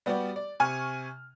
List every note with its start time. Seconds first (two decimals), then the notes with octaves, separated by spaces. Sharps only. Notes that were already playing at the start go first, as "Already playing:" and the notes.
0.06 G3 B3 F#4 G4 D5
0.36 D5
0.60 C3 G#5 C#6 F6